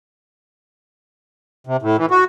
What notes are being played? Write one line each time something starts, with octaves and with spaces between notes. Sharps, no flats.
C3
A2
E3
F#4